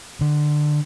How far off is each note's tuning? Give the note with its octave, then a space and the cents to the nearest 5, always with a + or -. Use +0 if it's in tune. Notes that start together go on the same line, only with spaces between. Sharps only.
D3 +20